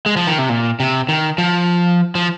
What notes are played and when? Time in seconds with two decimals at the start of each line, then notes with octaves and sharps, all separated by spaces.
0.06 G#3
0.17 F3
0.27 D#3
0.39 C3
0.49 A#2
0.80 C3
1.09 D#3
1.38 F3
2.15 F3